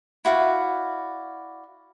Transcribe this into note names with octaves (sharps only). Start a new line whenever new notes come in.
E4 F#4 D5 F5